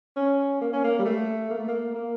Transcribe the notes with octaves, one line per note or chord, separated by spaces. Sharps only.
C#4
A#3
C#4
A#3
G3
A3
A#3
A3
A#3
A#3